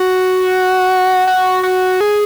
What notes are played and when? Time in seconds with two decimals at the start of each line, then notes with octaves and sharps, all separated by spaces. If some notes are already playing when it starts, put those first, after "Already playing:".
Already playing: F#4
1.27 F#4
1.63 F#4
2.01 G#4